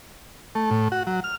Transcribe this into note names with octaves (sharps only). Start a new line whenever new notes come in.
A3
A2
F#4
F#3
F6